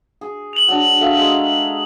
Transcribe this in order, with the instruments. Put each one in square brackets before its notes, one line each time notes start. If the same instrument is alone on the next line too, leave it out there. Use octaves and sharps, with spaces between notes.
[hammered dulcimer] G#4
[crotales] F7 F#7
[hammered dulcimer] F#3 D4
[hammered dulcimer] F#3 F#4 G#4 [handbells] A4 E5 F5
[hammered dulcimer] G#3 A#5